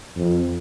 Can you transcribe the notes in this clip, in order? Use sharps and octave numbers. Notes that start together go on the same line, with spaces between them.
F2